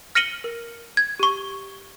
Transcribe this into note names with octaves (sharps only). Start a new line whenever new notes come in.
F6 A#6 C#7 D#7 F#7 G7
A#4
G#6
G4 C#6